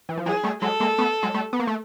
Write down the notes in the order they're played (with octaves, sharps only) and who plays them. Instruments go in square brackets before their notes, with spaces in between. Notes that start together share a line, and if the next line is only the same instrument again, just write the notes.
[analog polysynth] E3
F3
[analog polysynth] E3 F#3 [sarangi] G#4
[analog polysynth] G3 A3
[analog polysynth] F#3 G#3 [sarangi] A4
[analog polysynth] G#3 A#3
A3 B3
F#3 G#3
G3 A3
B3
A#3
A3